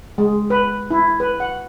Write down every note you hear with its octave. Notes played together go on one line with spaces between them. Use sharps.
G#3
B4
E4
B4
F#5